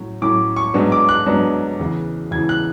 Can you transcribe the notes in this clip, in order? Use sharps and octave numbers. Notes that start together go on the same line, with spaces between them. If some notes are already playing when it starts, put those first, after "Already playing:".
Already playing: A2 F#3 C#4
A2 F#3 C#4 D6
C#6
G#2 F#3 B3 D4
D6
F#6
G#2 F#3 B3 D4
E2 C#3 E3
E2 C#3 E3 G#6
F#6